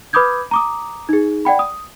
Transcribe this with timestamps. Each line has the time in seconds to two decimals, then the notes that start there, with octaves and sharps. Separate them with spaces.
0.13 B4 B5 D6 D#6 G6 G#6
0.51 A#5 D6 D#6
1.09 D#4 G#4
1.45 D5 F#5 G5 B5
1.59 D#6